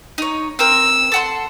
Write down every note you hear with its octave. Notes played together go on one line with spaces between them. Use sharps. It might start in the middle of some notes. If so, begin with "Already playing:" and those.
D#4 C#5
C4 A#4 E6
A4 F#5 C6